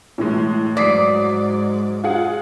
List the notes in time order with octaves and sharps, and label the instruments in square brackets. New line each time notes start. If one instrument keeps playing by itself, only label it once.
[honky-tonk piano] A2 E3 G#3
[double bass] G#2 F#3 [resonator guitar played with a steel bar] D5 [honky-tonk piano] D#6 B6 C7
[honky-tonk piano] F4 G#4 F#5